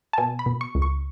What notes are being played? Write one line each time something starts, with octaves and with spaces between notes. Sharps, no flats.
A5
B2 G#5
B5
B2
C#6
C#2
C#6